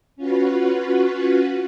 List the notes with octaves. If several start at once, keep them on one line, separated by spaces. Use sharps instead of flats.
C#4 F4 F#4 B4